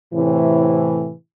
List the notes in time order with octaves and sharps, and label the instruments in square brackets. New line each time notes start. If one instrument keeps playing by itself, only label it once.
[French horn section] A2 C3 E3